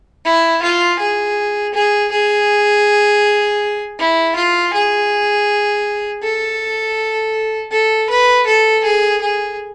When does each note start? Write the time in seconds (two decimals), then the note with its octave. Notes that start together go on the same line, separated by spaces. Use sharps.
0.25 E4
0.62 F4
0.99 G#4
1.74 G#4
2.12 G#4
3.99 E4
4.36 F4
4.74 G#4
6.23 A4
7.72 A4
8.10 B4
8.47 A4
8.84 G#4
9.21 G#4